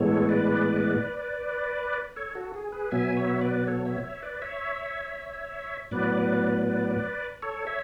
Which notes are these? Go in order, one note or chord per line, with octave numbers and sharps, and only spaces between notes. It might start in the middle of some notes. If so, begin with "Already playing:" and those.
Already playing: A2 E3 G#3 B3 A4 C#5
B4 D5
A4 C#5
F#4 A4
G#4
G#4 B4
B2 F#3 B3 E5 G#5
C#5 E5
C#5
B4 D5
A4 C#5
C#5 E5
C#5 E5
B4 D5
C#5 E5
A2 F#3 B3 B4 D5
A4 C#5
C#5 E5